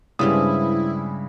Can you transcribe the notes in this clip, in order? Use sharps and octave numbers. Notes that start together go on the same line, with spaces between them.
G2 C#3 G3 G#3 B3 C4 E4 D#6